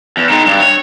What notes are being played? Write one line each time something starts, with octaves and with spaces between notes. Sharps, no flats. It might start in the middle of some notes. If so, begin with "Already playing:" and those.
E2
D#3 G#3
G2
C#5